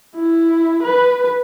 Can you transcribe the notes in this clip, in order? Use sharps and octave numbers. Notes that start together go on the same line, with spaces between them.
E4
B4